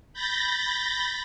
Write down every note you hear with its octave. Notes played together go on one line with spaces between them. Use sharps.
B5 G6 A6 A#6